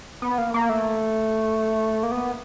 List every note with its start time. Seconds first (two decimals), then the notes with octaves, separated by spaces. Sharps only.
0.22 B3
0.38 A#3
0.54 A#3
0.69 A3
2.03 A#3
2.12 B3